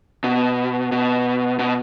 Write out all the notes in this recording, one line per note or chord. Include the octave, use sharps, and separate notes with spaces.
B2
B2
B2